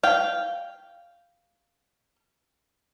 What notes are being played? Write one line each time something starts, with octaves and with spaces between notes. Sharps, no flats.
F5 G5